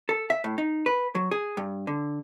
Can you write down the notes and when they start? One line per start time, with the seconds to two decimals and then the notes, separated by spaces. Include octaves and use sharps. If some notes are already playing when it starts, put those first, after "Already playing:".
0.09 A4
0.30 E5
0.44 A2
0.58 D#4
0.86 B4
1.15 F#3
1.31 G#4
1.57 G2
1.87 D3